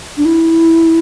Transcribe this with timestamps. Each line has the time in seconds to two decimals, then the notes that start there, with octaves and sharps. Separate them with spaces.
0.17 D4
0.25 E4